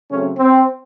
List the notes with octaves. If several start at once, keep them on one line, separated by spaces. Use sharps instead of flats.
C#3 F#3 A3 C4 C#4
C4